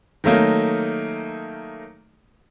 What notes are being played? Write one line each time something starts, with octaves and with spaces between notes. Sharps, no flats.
D#3 F#3 A3 A#3 D#4